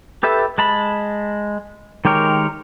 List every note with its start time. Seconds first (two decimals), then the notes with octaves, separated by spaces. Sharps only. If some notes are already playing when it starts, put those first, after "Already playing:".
0.23 G4 A4 B4 E5
0.58 G#3 A5 B5
2.05 D#3 G#3 G4 A#4 C#5